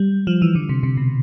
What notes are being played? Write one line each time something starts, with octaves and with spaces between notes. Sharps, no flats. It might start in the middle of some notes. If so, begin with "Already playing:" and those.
Already playing: G3
F3
E3
D3
C3
C3
B2